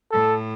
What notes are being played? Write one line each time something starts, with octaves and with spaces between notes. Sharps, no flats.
A2 A4